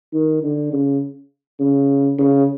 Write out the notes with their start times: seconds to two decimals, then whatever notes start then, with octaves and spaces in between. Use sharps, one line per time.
0.13 D#3
0.43 D3
0.72 C#3
1.59 C#3
2.18 C#3